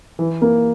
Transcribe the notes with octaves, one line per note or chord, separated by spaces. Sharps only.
E3
A#3